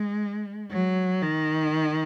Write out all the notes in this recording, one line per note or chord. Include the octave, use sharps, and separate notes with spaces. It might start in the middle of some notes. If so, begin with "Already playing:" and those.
Already playing: G#3
F#3
D#3